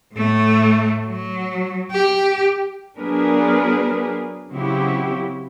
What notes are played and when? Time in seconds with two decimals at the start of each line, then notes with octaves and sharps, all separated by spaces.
0.14 A2 A3
1.07 F#3
1.91 G4
2.98 F#3 B3 D4 G#4 A#4 B4
4.52 C#3 F#3 C4 E4 F#4 G4